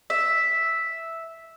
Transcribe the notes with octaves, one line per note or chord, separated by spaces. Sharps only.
E5